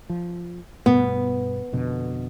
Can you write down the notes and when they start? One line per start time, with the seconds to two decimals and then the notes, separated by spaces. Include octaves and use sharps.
0.10 F3
0.86 G2 B2 B3
1.73 F2 B2 D3